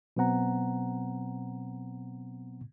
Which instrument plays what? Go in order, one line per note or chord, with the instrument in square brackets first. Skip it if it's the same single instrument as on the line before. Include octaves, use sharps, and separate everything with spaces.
[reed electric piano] B2 F#3 B3 C4 F#5 A#5